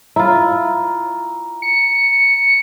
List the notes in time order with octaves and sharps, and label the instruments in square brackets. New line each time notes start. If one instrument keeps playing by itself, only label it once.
[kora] E4 F4 [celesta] A#5
[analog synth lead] C#7